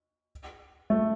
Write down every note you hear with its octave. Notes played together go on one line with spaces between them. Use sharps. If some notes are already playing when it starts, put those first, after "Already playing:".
A3